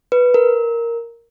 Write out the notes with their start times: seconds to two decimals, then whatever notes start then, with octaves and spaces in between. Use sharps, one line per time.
0.12 B4
0.34 A#4